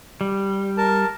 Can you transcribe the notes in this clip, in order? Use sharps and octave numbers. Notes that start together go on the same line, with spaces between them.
G3
A#4 A5